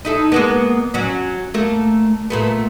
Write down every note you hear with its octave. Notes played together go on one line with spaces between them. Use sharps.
D#4 E4 A4
G#3 A#3 B3
F#3 C#4
A3 A#3
A#2 A3 B3